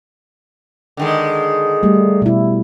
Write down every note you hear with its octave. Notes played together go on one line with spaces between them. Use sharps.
D3 D#3 G#3
G3 A3
B2 E4